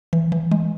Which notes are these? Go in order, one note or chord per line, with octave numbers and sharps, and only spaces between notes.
E3
E3
G#3